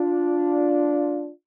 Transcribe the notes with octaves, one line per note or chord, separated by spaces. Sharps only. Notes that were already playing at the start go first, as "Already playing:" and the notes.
Already playing: D4 F4